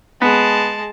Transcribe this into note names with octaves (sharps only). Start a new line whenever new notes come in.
G#3 B3 A5